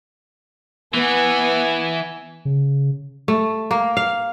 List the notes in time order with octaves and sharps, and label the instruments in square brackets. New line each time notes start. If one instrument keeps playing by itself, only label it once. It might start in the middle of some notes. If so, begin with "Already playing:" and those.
[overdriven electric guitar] E3 [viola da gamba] B3 [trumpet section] G#5
[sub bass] C#3
[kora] A3
A#3
F5